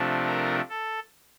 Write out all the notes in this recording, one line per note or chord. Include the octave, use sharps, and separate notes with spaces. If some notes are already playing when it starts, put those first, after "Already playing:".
Already playing: C3 F3 A3 D4
A#4
A4